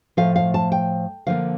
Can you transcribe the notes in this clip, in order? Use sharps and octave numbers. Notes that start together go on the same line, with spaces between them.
A2 F3 A3 F5
F5
A5
G5
D3 F3 A#3 F5